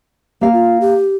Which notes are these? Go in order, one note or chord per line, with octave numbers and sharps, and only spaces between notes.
A#3 G4 F5
F4
G4